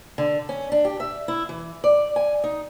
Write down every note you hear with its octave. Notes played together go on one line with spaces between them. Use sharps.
D3
C#4
D4
G4
E5
E4
E3
D5
G#5
D#4